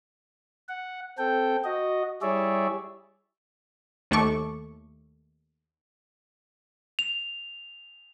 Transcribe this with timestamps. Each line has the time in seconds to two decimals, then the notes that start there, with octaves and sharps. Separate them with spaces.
0.69 F#5
1.18 C4 A4 G5
1.64 F#4 D#5
2.22 G3 E4 G#4 C#5 D5 E5
4.11 D#2 A3 A4 C#6 D6
6.99 F7